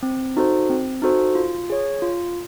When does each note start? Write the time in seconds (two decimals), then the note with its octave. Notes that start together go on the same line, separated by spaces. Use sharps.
0.03 C4
0.37 D#4 F#4 A4 C5
0.70 C4
1.02 D#4 F#4 A4 C5
1.35 F4
1.70 G#4 C#5
2.02 F4